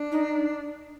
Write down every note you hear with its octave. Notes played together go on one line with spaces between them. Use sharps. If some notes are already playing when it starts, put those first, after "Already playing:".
Already playing: D4
D#4